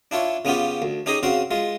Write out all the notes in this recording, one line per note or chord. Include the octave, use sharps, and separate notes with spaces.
D4 E4 F4 C#5
C#3 B3 C#4 F4 G4
D2
C#4 D#4 G4 G#4 D#5
C#3 C4 F#4 F5
G#3 F4